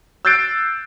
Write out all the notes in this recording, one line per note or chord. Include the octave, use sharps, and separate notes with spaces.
E6 F#6 G6 A6 C7 D7